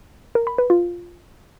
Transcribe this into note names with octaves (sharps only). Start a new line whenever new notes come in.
A#4
B5
B4
F4